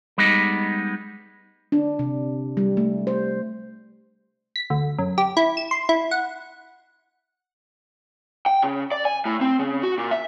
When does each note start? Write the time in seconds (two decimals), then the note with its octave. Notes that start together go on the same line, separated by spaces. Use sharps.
0.18 G3 G#3 B3 D#4
1.72 D4
1.99 C3
2.57 G3
2.77 A3
3.07 C5
4.56 B6
4.70 D2
4.99 F#2
5.18 G4
5.37 E4
5.57 E7
5.71 C6
5.89 E4
6.11 F#5
8.46 G5
8.62 C#3
8.91 D5
9.05 G#5
9.25 A2
9.41 C4
9.59 C#3
9.83 F#4
9.98 A#2
10.11 E5